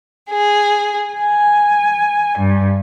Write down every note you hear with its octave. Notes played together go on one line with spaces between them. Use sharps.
G#4
G#5
G2